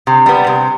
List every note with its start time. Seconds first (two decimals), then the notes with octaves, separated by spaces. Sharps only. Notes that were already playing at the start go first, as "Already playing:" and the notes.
0.07 C3
0.26 G3 B3
0.47 C3